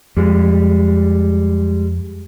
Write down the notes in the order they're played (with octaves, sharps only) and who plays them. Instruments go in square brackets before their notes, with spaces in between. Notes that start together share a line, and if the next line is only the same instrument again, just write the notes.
[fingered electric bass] F2 [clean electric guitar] G3 G#3